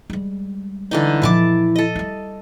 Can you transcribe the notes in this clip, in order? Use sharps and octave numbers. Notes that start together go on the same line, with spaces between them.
G3 G#3
D3 E3 D#4
A#2 F3 E4 A5 D6
A4 D#5
G3 E4